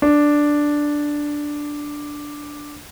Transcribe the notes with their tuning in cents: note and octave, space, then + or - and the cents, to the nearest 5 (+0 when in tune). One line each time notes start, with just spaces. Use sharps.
D4 +0